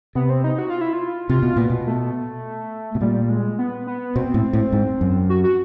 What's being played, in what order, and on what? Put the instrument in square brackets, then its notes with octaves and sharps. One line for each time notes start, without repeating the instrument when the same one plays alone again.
[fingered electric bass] C3 [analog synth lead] B3
[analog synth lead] C4
D#4
F#4
F4
E4
F4
[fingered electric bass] C3 [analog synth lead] F4
[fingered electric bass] B2
[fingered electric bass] A#2 [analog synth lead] B3
[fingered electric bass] B2
[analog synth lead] A3
[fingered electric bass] B2
[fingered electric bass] A#2 [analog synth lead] G3
[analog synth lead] G#3
B3
B3
[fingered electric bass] B2 [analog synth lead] C4
[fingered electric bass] A2
A2
G#2
F#2
[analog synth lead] F#4
F#4